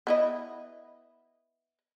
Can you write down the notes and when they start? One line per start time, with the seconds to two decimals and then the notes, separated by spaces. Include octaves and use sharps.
0.07 B3 E4 D#5